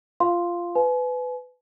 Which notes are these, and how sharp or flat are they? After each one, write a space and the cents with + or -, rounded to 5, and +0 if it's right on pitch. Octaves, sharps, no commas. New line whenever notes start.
F4 -10 F5 -5 C6 +0
B4 +20 G#5 +40